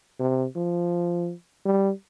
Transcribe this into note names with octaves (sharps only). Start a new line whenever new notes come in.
C3
F3
G3